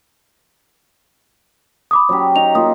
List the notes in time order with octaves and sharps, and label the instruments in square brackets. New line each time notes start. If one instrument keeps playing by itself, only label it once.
[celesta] B5 D6 D#6
[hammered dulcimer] F#3 C#4 G4
[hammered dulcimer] D#4 [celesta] F7
[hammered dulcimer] A#3 F4 [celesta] D#6